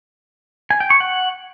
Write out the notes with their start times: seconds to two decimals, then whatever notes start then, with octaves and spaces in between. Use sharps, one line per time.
0.71 G#5
0.80 G5
0.90 C#6
1.00 F#5